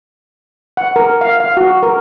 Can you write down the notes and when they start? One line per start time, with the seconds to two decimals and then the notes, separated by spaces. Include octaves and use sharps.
0.77 F#5
0.96 A#4
1.21 F5
1.40 F5
1.57 F#4
1.83 A#4